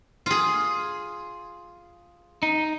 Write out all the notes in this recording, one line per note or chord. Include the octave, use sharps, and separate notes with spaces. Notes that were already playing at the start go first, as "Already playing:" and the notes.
F4 G#4
D#4